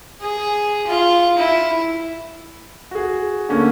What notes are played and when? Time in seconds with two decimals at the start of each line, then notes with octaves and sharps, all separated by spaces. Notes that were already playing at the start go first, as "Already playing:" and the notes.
0.21 G#4
0.87 F4
1.38 E4
2.91 F#4 G#4
3.49 D3 A3 A#3 C#4